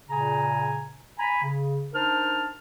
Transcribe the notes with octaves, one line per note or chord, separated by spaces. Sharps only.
A#2 C#3 G#5 A#5
G#5 A#5 B5
C#3
D4 D#4 A#4 C5 A5 F6